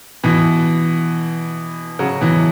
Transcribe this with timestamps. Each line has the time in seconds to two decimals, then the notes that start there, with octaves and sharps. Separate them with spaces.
0.23 B2 E3
1.99 C#3 F#3
2.21 B2 E3